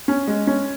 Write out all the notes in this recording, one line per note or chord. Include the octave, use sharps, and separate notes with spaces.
C#4
G#3
C#4